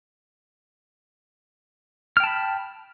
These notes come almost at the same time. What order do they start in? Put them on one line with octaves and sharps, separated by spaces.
F6 G5 A5 B5